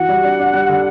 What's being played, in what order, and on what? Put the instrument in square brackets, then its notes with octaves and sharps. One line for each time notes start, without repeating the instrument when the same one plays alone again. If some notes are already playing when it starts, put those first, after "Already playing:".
Already playing: [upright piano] E3 F#4 [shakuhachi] F#5
[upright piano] G3
D4
D4
G3
D3